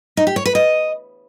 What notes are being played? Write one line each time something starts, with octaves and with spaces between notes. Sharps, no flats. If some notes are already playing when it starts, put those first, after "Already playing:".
D#4
G4
C#5
B4
D#5